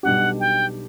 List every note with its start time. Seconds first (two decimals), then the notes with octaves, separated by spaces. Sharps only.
0.03 B1 B2 G3 D4 G4 F#5
0.40 G5